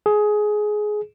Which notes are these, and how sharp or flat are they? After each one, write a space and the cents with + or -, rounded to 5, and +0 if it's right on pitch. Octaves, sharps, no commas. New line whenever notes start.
G#4 +15